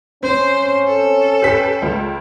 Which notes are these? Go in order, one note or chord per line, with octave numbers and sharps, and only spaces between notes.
C4 C#4 C5
A4
G4 B4 B6
C#2